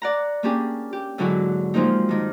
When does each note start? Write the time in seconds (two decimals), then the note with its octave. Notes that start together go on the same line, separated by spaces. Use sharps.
0.02 D5 F#5 A#5
0.43 A#3 C#4 D4 G4 G#4
0.93 G4
1.18 G#2 D3 F#3 E4 F#4 G#4
1.74 F3 G#3 A#3 C4 D#4
2.09 G2 D#3